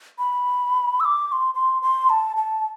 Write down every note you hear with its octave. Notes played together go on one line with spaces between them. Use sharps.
B5
E6
D6
D6
C6
C6
C6
A5
A5